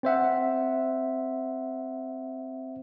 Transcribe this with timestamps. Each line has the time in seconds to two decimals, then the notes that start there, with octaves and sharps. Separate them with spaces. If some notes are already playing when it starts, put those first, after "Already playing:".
0.03 C4 C5 E5 F#5